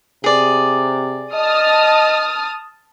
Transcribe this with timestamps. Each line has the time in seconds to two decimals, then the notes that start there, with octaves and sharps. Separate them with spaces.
0.24 C3 G#4 D5
1.35 D#5 A5 D#6 F6